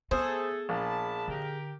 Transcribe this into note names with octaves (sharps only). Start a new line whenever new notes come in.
A3 B3 G#4 A4 C5
A#1 A5 B5
D3 G4 A#4